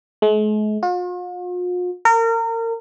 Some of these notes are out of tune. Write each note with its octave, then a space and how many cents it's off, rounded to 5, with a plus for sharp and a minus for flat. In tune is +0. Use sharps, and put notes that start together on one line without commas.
G#3 +45
F4 +45
A#4 -30